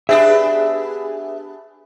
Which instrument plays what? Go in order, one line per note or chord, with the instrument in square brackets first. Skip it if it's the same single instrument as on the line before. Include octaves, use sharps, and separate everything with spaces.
[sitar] B3 D4 G4 [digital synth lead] G#4 [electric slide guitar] E5